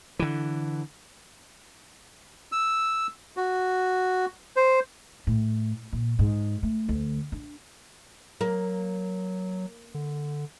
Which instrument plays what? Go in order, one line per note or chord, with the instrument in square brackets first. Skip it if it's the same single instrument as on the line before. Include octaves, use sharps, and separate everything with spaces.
[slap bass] D3 E3
[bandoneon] E6
F#4
C5
[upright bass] A2
A#2
G#2
A3
D2
D4
[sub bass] F#3 [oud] A#3
[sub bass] D3